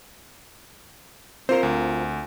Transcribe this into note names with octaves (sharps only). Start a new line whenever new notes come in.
C4 F4 A#4 C5
D2